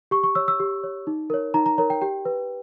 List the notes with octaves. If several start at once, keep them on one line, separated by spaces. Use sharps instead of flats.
G4 C#6
C#6
C#5 E6
E6
G4
C#5
D#4
A#4 C#5
D#4 A#5
A#5
A#4 C#5 A#5
G5
G4 G5
B4